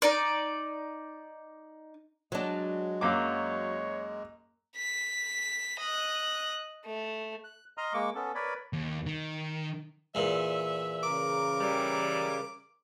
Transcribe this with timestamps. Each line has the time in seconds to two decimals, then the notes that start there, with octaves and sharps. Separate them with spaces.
0.02 D#4 D5
2.32 F#3 G#3 D4
3.01 F#2 A#3 C#5 D6
4.76 B6
5.80 D#5 F#6
6.85 A3
7.44 F#6
7.78 D#5 A#5 C6 D#6 F6
7.94 G#3 A#3 C#6 D6
8.15 B3 C#4 A4
8.35 A#4 B4 C#5 D5 B5
8.73 D#2
9.06 D#3
10.15 E2 A#2 E5
11.03 C#3 A#4 D6
11.61 E3 G3